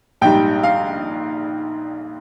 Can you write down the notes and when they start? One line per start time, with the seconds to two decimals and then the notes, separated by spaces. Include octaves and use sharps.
0.21 A#1 G#2 G3 G5
0.63 F5